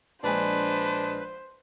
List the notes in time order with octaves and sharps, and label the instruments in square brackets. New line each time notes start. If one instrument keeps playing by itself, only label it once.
[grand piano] A#1 G#3 G#5 [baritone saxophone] D4 [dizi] B4 [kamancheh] C5